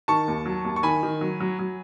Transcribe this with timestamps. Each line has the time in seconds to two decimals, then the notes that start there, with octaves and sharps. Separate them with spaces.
0.08 D#3 A5 C#6
0.28 D#2
0.46 F#3
0.65 D#2
0.76 C#6
0.83 D#3 G#5 B5
1.03 D#3
1.21 F#3
1.40 F#3
1.59 F#3